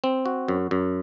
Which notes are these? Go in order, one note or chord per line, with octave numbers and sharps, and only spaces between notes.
C4
F#4
F#2
F#2